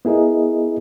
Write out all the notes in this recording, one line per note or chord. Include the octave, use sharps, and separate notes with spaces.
B3 E4 G#4 A#4 D#5